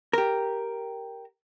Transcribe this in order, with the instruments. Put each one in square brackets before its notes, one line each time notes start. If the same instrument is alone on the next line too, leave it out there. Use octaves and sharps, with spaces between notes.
[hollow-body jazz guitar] G4 A#4